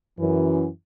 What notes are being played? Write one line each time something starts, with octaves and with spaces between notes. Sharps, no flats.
F#2 E3